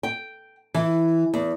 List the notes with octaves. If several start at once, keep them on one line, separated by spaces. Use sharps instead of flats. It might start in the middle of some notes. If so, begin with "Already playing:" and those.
G5
E3
E2